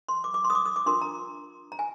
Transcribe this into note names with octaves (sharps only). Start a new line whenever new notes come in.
C6
D6
D6
C6
D#6
D6
D#6
D6
D4 F4 A#4 C6
A#5
A#5
G#5